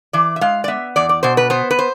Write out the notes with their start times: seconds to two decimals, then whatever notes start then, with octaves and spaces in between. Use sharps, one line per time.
0.13 E3 D5
0.36 E5
0.41 G#3 F5
0.64 D5
0.68 B3 E5
0.96 E2 D5
1.09 D5
1.23 B2 C5
1.37 B4
1.50 B3 C5
1.71 B4
1.79 C5